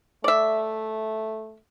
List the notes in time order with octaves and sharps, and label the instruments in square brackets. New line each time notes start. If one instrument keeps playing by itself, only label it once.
[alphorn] A3 [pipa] D5 E5